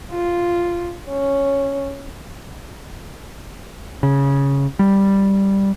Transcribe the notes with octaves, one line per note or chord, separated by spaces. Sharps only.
F4
C#4
C#3
G3